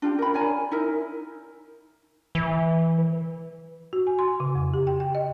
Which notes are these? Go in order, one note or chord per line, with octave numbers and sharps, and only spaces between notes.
D4 F4 G4
A#4 B5
C#5 D5 G#5 A#5
D#4 E4 A#4
E3
F#4
G#5
C6
C#3
F2
G4
G5
G5
D#5